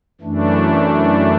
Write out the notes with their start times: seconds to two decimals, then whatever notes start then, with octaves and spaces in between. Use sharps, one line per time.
0.21 F#2 E3 A3 D4